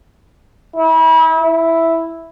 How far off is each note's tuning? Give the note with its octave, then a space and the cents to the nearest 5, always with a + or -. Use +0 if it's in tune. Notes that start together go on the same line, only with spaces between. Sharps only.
E4 -35
E4 +0